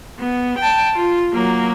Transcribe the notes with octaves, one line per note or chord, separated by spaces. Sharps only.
B3
G5 A5
F4
F#3 A#3